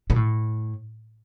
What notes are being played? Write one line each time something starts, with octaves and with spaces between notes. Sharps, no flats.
B2
A2